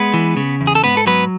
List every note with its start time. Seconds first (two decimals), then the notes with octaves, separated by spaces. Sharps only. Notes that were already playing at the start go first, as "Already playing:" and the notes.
Already playing: G#3 B3 B4
0.14 E3
0.37 C#3
0.61 E2
0.67 G#4
0.75 A4
0.84 G#2 B3 B4
0.97 A4
1.07 F#3 B3 B4